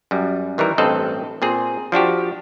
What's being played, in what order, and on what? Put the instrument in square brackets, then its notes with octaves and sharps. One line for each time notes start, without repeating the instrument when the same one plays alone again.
[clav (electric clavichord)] F#2 G3
D#3 E3 G3 A#4
A1 G2 C4 A4 D#5
A#2 C4 G#4
F3 D4 F#4 G4